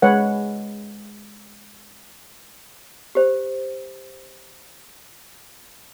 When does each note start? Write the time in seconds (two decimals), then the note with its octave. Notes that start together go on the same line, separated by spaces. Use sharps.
0.02 G#3 B4 C#5 F#5
3.15 G4 C5